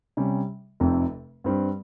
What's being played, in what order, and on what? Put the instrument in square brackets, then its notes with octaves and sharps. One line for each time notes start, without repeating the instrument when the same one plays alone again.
[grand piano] C3 G3 C#4
F1 F2 C3
G2 G3 C4